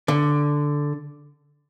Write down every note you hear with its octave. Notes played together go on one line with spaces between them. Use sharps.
D3